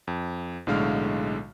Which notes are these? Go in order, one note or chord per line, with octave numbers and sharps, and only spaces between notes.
F2
B1 A2 D3 G#3 F5 F6